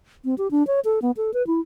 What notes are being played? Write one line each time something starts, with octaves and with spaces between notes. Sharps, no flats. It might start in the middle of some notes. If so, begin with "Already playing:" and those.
C4
G4
D4
C#5
A4
B3
A4
B4
E4